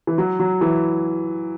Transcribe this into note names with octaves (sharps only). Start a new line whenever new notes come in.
E3
F#3
F#3
E3